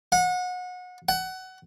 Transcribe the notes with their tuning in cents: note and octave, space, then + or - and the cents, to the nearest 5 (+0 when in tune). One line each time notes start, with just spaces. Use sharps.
F#5 -30
F#5 +20